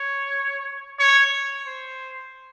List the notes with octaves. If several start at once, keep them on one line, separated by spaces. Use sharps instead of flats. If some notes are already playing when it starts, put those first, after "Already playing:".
Already playing: C#5
C#5
C5